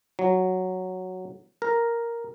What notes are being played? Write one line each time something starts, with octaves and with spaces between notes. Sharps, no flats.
F#3
A#4